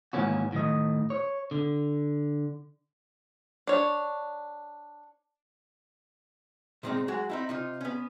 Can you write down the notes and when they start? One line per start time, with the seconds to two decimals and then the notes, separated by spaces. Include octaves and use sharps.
0.13 G#2 D#3 E3 A#3 C#4 F#4
0.52 A2 D#3 D#5
1.10 C#5
1.51 D3
3.67 D4 C#5
6.83 A#2 D#3 G#3 B3 C4 D#4
7.08 F#3 G#3 F#4 G#4
7.30 C4 D#4 E4
7.49 C3 D#4 F4
7.81 B3 C#4